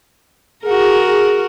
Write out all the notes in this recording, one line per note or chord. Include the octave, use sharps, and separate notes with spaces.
F#4 G#4 A#4